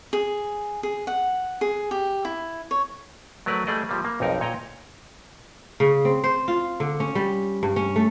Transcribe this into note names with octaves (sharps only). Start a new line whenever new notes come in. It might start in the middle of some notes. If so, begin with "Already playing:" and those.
G#4
G#4
F#5
G#4
G4
E4
C#5
F#3 A3 A#4 B4 D5
G3 A3 G#4 D5 D#5
F3 G3 A#3
A#3
B1 F2 D#4 A#4
A#2 C#5 D#5 G5 A#5
C#3
C4
C5
F4
D3
C#4
G3
G2
C#4
A3